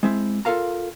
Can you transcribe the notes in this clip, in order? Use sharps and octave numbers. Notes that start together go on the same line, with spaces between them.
G#3 C4 E4
F4 A4 A#4 F5 A#5